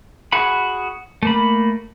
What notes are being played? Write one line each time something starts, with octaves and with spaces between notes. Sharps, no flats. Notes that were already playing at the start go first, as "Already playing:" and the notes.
F#4 G#4 F#5 B5
A3 A#3 B5